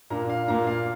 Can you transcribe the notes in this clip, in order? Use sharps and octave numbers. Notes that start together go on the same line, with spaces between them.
A#2 A#3 D4 A#5
F5
A#2 A#3 D4 A#5
F5